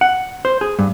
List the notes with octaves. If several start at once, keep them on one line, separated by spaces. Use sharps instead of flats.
F#5
C5
G#4
G2